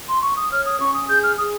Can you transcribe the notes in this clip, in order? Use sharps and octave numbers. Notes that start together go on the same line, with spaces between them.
C6
C#6
D#6
C#5 F6
D#6
C#4 C#6
D#6
G#4 G6
F6
G#4 D#6